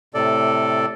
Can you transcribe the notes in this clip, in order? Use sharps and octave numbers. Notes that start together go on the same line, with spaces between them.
A2 C3 A4 D5